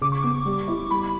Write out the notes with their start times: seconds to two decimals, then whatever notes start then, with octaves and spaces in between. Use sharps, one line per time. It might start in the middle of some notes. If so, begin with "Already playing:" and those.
0.01 C#3 D6
0.12 C#6
0.23 B3 D6
0.46 G3
0.68 E4
0.91 G3 B5